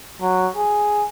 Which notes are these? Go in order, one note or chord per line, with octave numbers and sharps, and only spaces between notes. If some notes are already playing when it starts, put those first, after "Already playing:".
F#3
G#4